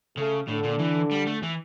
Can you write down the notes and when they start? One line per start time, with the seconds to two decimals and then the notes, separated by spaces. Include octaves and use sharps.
0.17 C#3 A3
0.48 A2 D3
0.64 A#2
0.80 E3
1.11 G3
1.27 A3
1.43 E3